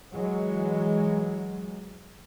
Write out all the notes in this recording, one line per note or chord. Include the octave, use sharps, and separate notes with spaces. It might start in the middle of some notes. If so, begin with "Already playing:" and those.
E3 F#3 G#3